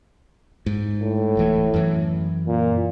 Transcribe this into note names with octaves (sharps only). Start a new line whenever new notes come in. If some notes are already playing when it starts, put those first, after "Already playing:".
G#2
A2
D1 E3 A3
F#2 E3
A#2